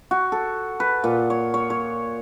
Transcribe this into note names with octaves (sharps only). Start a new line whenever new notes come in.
F#4
A4
B4
A#2
C#5
C#5
C#5